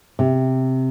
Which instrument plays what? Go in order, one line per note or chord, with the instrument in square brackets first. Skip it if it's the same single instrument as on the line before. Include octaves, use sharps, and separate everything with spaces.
[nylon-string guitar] C3